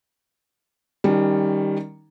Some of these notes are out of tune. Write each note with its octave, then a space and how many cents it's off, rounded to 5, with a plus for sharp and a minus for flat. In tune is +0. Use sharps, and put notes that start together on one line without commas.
D#3 +0 G3 +10 C#4 +10